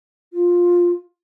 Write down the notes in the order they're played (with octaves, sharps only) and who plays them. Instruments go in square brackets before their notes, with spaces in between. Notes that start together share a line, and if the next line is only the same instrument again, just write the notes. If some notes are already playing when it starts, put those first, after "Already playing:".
[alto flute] F4